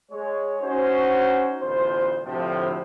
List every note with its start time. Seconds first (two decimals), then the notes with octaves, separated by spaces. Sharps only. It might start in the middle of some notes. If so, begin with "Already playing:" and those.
0.12 G#3 C#5
0.62 C#4 D#4 F#4 C5
1.61 A1 D2 B3 F4 C5
2.25 D2 A2 C3 F3